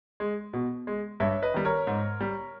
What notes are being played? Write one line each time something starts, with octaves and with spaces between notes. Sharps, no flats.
G#3
B2
G#3
G2 C#5 E5
B4 D#5
D#3 G3
A#4 C#5
G#2
G3